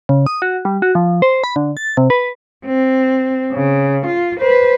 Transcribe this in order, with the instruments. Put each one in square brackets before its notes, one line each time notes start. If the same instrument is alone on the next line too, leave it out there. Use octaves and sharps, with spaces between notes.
[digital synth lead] C#3
D#6
F#4
G3
F#4
F3
C5
B5
D3
A6
C3
B4
[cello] C4
C#3
F4
B4 C5